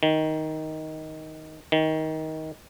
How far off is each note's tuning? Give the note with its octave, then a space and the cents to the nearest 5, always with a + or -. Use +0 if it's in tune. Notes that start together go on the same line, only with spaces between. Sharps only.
D#3 +10
D#3 +20